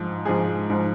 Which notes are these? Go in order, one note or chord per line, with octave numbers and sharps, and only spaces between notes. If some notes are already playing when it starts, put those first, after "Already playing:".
Already playing: G#2 F3
G#2 F3 G#4
G#2 F3